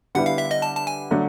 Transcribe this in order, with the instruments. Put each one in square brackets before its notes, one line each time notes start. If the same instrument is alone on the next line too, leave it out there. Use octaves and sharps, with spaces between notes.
[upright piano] D3 G3 B3 E4 [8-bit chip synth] F#5
[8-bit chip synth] F5
E5
D#5
A5
A5
G#5
[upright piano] D3 F#3 A3